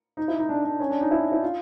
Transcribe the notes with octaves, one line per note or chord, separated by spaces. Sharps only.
D#4
E4
D#4
D4
D4
C#4
D4
D#4
E4
E4
F4